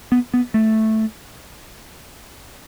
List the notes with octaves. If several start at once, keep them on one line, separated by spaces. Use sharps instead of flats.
B3
B3
A3